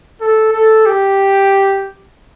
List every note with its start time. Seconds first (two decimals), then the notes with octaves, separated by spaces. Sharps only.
0.21 A4
0.53 A4
0.86 G4